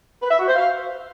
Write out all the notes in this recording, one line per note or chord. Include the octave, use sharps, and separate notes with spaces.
B4
E5
F#4
C5
F5